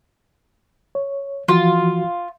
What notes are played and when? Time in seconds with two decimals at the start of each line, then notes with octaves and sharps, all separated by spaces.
0.95 C#5
1.48 E3 F3 F4 F#4